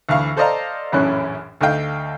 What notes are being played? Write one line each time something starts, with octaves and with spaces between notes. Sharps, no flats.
D2 E3 F5 C#6 F6
A4 C5 D5 D#5 F5 A#5
A#1 F#2 A2 E3 C#4 F#6
D2 A3 D#5 F5 G5